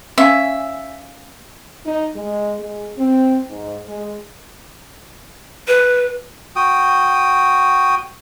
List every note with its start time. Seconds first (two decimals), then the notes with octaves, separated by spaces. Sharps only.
0.18 C#4 E5 F5 G#5
1.86 D#4
2.15 G#3
2.59 G#3
2.97 C4
3.50 G#2
3.88 G#3
5.68 B4
6.56 F#4 G5 D#6